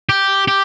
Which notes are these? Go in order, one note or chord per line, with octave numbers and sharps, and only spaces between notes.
G4
G4